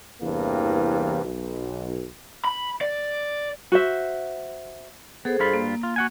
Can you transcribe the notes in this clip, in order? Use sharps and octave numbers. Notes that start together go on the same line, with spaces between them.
E2 G2 C3 E3 A#3
B1
B5
D5
F#4 C5 E5
B3 G#4 A4 C5
G2 F4 B5
A#3
F4
F#4 F#5 G#5